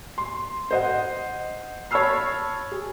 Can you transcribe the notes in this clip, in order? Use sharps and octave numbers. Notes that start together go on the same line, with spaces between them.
C6
C5 D#5 F#5
C#5 A5 B5 E6 F6 C7
G#4